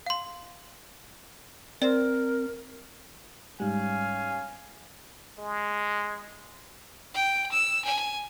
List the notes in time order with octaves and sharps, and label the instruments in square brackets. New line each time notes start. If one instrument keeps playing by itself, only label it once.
[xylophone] F5 C6
[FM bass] C4 [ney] A#4 [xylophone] D5
[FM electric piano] G#2 G3 [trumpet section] C#4 F5 G#5
[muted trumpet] G#3
[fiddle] G5
E6
G#5